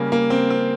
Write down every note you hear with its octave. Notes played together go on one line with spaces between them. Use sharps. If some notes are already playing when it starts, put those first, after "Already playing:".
Already playing: C#3 G3 A#3
A#3
C4
C4